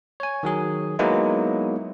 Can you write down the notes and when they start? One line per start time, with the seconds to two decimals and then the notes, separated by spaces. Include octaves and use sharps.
0.20 C#5 G#5
0.43 D#3 F#3 G#4
0.99 F#3 G#3 A#3 B3 D#4 E4